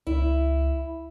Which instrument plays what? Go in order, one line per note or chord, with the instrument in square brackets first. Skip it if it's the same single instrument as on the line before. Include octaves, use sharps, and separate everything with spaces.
[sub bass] C#2 [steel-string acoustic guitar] E4